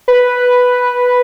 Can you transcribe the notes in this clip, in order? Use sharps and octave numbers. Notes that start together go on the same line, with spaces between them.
B4